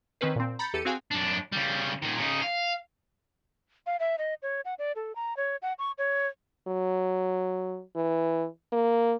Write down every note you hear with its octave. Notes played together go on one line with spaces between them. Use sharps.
D#3 C4 C#4 B4 C5
A#2 C4
A#5 B5 G6 A6 C#7
E2 G4 A4 C#7 D#7
C4 F#4 G#4 F5 G5 G#5
F#2 D4
C#3 G3
A#2 D#3
C#3 D#4
F5
F5
E5
D#5
C#5
F#5
D5
A4
A#5
C#5
F#5
C#6
C#5
F#3
E3
A#3